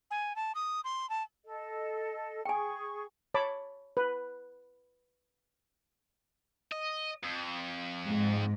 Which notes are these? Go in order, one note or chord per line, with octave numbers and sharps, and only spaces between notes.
G#5
A5
D#6
C6
A5
A4 D#5
G#4 G5 G#5 C#6
C#5 A5 B5 D6
B4
D#5
F2
G#2